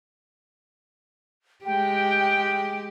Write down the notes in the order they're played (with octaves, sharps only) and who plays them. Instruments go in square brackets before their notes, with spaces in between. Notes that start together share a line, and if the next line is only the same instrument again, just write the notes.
[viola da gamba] G#3 G4 [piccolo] G5